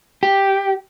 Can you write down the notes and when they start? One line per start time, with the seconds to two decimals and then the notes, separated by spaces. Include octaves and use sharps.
0.23 G4